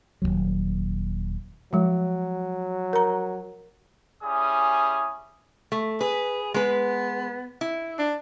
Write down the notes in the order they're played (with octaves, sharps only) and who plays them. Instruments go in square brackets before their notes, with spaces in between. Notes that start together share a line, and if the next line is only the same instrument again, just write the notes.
[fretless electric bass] D#1 A#1 D#2 F#3
[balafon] F3 G#3 [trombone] F#3
[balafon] A#4 A#5
[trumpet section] G3 C#4 E4 G#4 D#6
[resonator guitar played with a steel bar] A3
[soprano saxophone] G#4 [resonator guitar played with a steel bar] B4
[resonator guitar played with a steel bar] G#3 B4 [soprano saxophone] B3
[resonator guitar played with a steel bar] E4
[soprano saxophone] D4